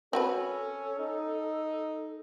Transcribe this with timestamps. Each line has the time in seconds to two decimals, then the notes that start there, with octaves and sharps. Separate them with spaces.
0.13 C4 C#4 F#4 A4 B4
1.00 D#4